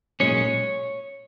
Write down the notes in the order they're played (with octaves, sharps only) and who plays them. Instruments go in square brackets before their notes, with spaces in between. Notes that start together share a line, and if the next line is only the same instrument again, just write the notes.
[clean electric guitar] B1 A#2 G#3 C#4 C#5